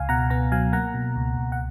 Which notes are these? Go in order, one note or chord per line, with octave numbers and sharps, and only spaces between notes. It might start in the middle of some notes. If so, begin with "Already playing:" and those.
Already playing: C#2 F5 G#5
B2 F#5 A#5
B3 F#5 A#5
F#3 F5 G#5
A#3 F#5 A#5
B2
C#2
C#2
F#5